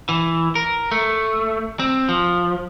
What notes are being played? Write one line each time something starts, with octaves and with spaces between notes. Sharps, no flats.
E3
A#4
A3
C4
F3